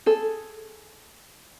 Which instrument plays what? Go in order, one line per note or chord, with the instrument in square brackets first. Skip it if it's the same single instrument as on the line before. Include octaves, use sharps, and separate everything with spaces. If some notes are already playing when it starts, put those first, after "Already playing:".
[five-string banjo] G#4 A4